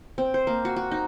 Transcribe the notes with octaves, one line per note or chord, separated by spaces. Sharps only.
C4
C5
A#3
F#4
F#4
D#4